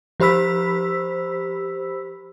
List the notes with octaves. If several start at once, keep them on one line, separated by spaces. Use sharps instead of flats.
F3 G4 C5 B5 E6 B6